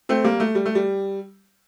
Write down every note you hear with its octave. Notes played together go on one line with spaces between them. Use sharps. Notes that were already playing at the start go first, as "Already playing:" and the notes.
A3 C4
G3 A#3
A3
G3
A3
G3